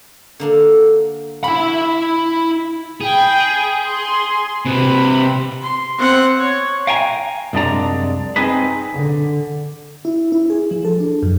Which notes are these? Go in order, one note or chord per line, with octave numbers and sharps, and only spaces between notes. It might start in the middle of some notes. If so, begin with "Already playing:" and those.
D3 A#3 D4
D4 E4 F#4 B5
G#4 G5 B5
C6
C3 B4 B5
C6
C4 F#5
C#5
F5 G5 G#5 A#5
C2 F#2 G#3 D4 D5 A#5
C4 D#4 G#4 B4
D3
E4
E4
G#4
F3
A4
D4
F#2